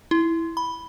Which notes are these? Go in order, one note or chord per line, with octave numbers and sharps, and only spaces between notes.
E4
B5